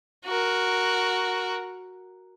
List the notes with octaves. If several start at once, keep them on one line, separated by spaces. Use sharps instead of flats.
F#4 A#4